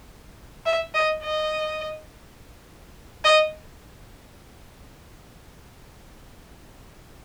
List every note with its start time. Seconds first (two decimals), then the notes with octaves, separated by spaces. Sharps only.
0.66 E5
0.95 D#5
1.23 D#5
3.25 D#5